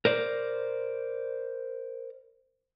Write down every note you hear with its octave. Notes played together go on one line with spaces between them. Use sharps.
A#4 C5 D5